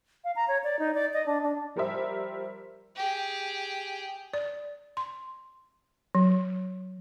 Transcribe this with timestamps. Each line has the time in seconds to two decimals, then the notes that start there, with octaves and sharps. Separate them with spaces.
0.24 F5
0.36 A#5
0.48 C#5
0.64 D5
0.79 D#4
0.94 D5
1.14 D#5
1.26 D4
1.43 D4
1.76 F3 G3 A#4 C5 E5
2.96 G4 G#4
4.34 D5
4.97 C6
6.15 F#3